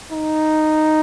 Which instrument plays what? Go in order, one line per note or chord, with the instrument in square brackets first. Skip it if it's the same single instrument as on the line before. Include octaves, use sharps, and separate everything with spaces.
[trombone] D#4